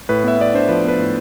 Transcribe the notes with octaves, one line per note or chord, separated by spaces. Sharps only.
A2 B4
B3 E5
B3 D5
D4 C5
F3 B4
B3 B4
A2